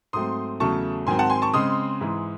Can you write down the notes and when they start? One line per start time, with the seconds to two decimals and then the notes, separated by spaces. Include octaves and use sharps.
0.13 G#2 F#3 A3 C4 C6 D#6
0.60 E2 C#3 F#3 A3 A5 C#6
1.07 G#2 D#3 F#3 C4 G#5 C6
1.19 F#5 A5
1.30 G#5 C6
1.42 A5 C#6
1.54 C#3 G#3 C4 C6 D#6
2.01 G#2 E3 G#3